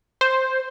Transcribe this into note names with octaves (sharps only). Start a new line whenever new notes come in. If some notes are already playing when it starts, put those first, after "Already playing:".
C5